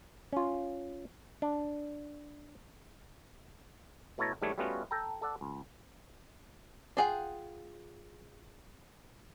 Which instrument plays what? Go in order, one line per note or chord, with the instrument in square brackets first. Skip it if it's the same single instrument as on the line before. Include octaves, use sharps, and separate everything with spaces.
[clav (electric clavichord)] C#4 F4
D4
B2 A3 E4 C#5 A5 A#5
G#2 E3 G3 A3 D4 C#5
G3 A3 B3 C#4 F4 F#4
A4 G5 A#5
A4 D5 F#5
C#2
[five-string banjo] D4 F4 G#4 F#5 G5